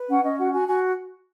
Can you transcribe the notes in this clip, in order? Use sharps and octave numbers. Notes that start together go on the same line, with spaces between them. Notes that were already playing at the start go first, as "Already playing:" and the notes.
Already playing: B4
C#4 F#5
C#4 D#5
F#4 F#5
F#4 G#5
F#4 G#5